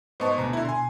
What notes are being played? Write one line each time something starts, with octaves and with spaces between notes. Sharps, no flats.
G#2 B3 C5 D#5 A5 C#6
D2 B2 A#5
D3 E4
G#5 C6